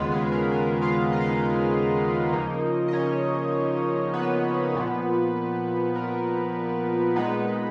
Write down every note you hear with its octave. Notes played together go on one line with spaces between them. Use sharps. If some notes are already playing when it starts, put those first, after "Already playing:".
Already playing: D#2 C#3 G#3 B3 F4 B4
G#4
A#4
A#4
F4 F5
D#5
F5
D#4 D#5
C#3 F3 A#3 D#4
D#5
C#4 C#5
B3 B4
A#2 F3 B3
A#4
A#2 G#3 B3 D#4 B4